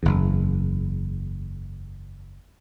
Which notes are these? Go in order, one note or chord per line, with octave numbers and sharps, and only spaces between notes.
F#1 E2